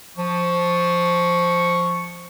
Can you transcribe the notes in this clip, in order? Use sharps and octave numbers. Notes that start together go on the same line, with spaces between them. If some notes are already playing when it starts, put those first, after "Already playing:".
F3 C#6